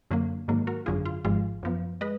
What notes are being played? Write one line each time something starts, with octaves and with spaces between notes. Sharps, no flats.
F#2 D3 F#3 A#3
G#2 D#3 F#3 A#3
F#4 A#4
G#1 F#2 D3 F#3 F4 G#4
F4
G#1 G#2 F3 G#3 F4
F#2 F3 B3
G#3 B4 D#5